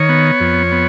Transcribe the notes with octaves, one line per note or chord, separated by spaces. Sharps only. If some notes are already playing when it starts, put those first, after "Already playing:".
Already playing: D#3 C#5
B3
F2
B3